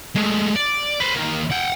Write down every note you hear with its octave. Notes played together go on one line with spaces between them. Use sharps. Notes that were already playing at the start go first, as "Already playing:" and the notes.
G#3 A3
D5
B4 C5
D#3 A#3
F#5 G5